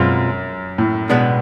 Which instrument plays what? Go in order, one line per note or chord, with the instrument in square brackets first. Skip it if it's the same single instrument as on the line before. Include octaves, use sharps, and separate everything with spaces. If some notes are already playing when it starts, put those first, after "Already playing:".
Already playing: [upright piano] F#2 [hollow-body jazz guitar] B2 G#3 C4 F4
[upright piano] A2
[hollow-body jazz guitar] B2 G#3 B3 D4